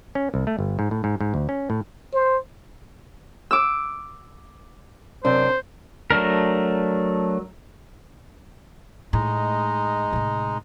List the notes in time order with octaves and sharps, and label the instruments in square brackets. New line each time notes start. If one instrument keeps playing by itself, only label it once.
[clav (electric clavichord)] C#4
C2
A3
G1
G#2
A2
G#2
G#2
D2
C#4
A2
[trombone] C5
[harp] D6 E6
[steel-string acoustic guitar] F#2 C3 D4 [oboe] C5
[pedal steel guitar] F#3 A3 D4 A#4
[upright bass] A2 [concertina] G#3 D#4
[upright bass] A2 C3